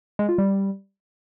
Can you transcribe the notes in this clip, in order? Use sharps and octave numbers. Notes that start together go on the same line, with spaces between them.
G#3
F4
G3